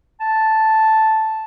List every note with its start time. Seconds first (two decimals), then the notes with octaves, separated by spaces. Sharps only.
0.20 A5